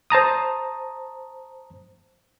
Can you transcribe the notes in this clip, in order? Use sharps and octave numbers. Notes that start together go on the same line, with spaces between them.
C5 A5 A#5 D#6